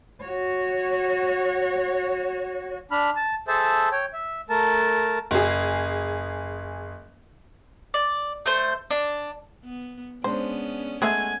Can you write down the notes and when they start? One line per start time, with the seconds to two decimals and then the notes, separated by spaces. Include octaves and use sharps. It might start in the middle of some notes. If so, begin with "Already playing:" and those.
0.22 F#4 C#5
2.91 D4 B5 F6
3.16 A5
3.48 G#4 A4 C5 E5 A5
3.92 C#5 G5
4.13 E5
4.49 A3 A#4 A5
5.31 F#1 G#4
7.94 D5
8.46 A3 C5
8.91 D4
9.65 B3
10.24 G#3 B3 C#4 D4 C5
11.02 G#3 A3 G#4 E5 F#5 G#5